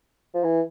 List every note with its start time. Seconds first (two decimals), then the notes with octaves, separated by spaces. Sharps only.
0.34 F3
0.44 E3